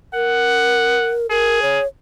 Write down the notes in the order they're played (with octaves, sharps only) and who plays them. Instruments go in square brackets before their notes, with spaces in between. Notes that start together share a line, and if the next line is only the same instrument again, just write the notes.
[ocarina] A#4 [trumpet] F#5
[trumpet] G#4 [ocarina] A#4
[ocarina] C#5